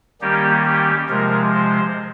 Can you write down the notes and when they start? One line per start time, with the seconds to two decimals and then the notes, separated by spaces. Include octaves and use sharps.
0.21 D#3 G3 A#3 C#4 G4
0.65 G4
1.09 C3 F3 G#3 A#4
1.53 C5